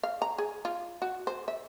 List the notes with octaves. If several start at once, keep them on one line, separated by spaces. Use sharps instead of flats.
F5
A#5
G#4
F4
F#4
C5
E5